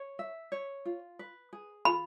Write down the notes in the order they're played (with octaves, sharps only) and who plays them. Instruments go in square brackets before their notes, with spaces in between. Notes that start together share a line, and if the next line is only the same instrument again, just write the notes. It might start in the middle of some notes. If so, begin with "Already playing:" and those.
Already playing: [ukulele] C#5
E5
C#5
F4
B4
G#4
[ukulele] F4 [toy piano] B5